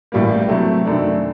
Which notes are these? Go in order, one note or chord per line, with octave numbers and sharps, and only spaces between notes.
A1 A2 G3 A#3
C3 F#3 A3
F#2 D#3 A3 D4 A4